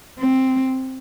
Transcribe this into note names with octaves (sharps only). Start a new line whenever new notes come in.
C4